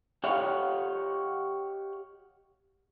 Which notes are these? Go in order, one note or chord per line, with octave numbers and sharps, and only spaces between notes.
G4 C#5 D#5 F5 F#5